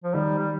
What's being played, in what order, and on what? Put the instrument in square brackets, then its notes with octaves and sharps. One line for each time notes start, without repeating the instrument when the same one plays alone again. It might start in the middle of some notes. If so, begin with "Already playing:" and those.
[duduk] F3
[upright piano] D#3 [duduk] G3
[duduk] G3